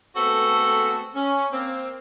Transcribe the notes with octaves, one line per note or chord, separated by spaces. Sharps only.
G#3 A3 B3 C4 F#4 A4
C#4
A#3 C4